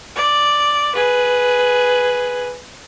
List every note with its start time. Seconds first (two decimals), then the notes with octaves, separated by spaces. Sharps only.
0.16 D5
0.95 G#4 B4